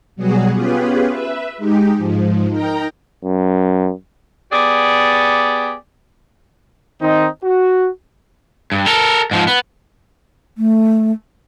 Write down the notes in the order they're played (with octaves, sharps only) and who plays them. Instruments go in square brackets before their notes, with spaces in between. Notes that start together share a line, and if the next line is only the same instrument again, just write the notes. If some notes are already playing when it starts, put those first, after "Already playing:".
[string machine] B2 F#3 G3 B3 F#4 G#4
B3 C#4 F4 G4 G#4 B4
B4 E5
G#3 D#4 G4
G#2 F3
D#4 A#4 G5 A#5
[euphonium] F#2
[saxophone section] B3 G4 G#4 D5
[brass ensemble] D#3 C4 D#4
F#4
[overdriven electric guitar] G2
A4 A#4
G#2 F3
B3
[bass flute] A3